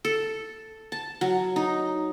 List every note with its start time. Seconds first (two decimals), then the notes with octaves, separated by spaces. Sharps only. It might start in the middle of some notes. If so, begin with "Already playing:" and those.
0.05 A4
0.92 A5
1.21 F#3
1.56 D#4